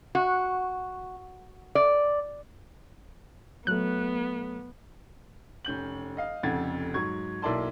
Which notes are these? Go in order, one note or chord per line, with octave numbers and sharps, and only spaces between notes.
F#4
D5
F#3 A3 B3 F#6
F1 C#4 G6 F#7
D#5 F5
F1 F2 C#3 F#5 G#6 A6
G#2 F#3 C#6 G#6
B1 A#3 E4 D5 A5 C6